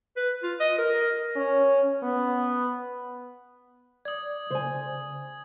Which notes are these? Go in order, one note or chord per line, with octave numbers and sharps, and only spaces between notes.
B4
F4
D#5
A#4
C#4
B3
D5 D#6 G#6
C#3 C5 G#5